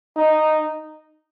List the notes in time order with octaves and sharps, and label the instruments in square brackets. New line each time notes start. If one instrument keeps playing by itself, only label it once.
[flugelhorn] D#4